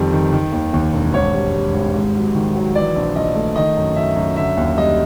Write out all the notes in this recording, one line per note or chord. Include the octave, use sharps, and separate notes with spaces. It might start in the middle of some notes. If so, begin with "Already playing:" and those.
Already playing: F2 D#3 G3
D#3
D#3
D#2
D#2
E1
G#1 C#5
G3
G3
G#1
G#2
F#3
D#3
F#3
E3 D5
A#1
A#1 D#5
A3
D#3 D#5
F#2
F#2 E5
F#2
D3 E5
D#2
G3 D#5